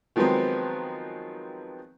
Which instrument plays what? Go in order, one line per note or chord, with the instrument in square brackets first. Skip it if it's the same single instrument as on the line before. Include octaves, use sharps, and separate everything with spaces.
[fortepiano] D#3 F3 F#3 G#3 B3 C4